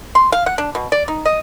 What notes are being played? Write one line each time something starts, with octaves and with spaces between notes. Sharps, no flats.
C6
F5
F#5
D4
B2
D5
D#4
D#5